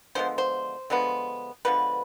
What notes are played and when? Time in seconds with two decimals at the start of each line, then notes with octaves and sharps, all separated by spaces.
0.15 D3 F3 G#3 B3 C5
0.38 C5
0.90 D3 F3 G#3 B3
1.65 D3 F3 G#3 B3 B4